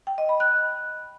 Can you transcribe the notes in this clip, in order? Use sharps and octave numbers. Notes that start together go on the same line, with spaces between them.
G5
D#5
B5
F#6